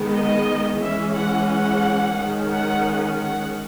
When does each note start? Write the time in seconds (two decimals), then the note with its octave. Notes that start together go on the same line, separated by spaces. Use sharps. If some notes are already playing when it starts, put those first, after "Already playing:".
Already playing: D#3 G#3 B3
0.14 D#5
0.81 E3 G#3 C#4 E5
1.15 F#5
1.48 F#5
2.17 D#3 G#3 C#4
2.51 F#5
3.18 F#5